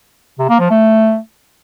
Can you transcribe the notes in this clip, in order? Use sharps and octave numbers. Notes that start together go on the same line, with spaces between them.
C3
A#3
F3
A3